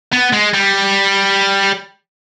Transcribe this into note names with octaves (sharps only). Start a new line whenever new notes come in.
B3
G#3
G3